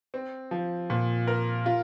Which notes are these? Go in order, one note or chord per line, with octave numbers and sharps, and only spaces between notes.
C4
F3
A#2
A#4
F4